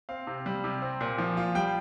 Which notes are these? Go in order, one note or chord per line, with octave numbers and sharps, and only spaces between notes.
C4 F5
C3
G3
C3
C4
A#2
F3
F4
G3 G5